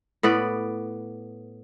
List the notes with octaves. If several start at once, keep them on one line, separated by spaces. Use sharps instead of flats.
A2 B3 B4 D5